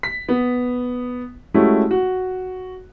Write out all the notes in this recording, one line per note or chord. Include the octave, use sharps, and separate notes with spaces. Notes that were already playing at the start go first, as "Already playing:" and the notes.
B6
B3
G#3 A3 C#4 E4 F#4 G4
F#4